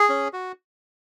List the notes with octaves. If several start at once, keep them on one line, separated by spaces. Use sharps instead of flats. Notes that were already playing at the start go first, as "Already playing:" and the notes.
Already playing: G#4
C#4
F#4